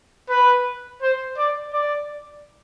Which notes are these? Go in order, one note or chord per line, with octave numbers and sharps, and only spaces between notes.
B4
C5
D5
D5